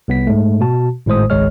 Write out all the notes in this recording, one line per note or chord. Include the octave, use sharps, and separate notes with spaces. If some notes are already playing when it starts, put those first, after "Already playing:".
C2 B3 B6
G#2 G#3 A3
B2 F#4 A5
G#1 A2 G#3 C5 D#6
G#1 C#2 G#3 C#5 D#5 F6